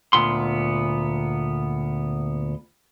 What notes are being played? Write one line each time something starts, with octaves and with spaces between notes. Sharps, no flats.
D2 A#2 B3 C6